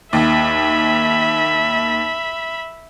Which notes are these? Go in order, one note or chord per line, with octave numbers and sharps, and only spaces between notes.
D#2 E5 B5